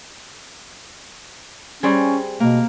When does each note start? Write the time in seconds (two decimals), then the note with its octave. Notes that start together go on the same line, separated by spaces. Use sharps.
1.83 G3 C4 C#4 G#4
2.40 B2 A#3